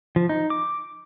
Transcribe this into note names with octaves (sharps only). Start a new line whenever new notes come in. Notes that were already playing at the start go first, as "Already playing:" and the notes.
F3
D#4
D6